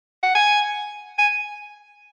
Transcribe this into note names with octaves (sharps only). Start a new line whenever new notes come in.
F#5
G#5
G#5